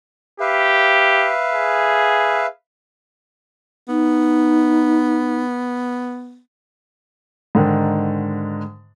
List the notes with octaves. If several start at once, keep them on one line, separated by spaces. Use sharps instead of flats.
G4 B4 E5 F5
G#4
B3 D#4
G#2 D3 D#3